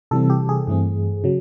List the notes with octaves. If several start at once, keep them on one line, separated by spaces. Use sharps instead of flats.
C3 E3 G3 C4 A4
G4
G#4
G2 E3 A3 C4
C#3 F#3